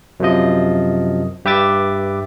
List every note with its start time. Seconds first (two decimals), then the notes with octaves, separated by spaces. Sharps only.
0.20 F#2 C3 F3 D#5
1.45 G2 G4 B4 E5 D6 A6